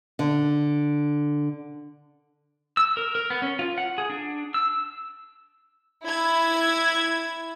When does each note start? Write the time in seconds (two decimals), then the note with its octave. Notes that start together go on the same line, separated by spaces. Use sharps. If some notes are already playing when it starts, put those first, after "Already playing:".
0.19 D3
2.77 E6
2.97 A#4
3.15 A#4
3.30 B3
3.42 C#4
3.59 F4
3.78 F#5
3.98 G#4
4.10 D4
4.54 E6
6.05 E4 G#6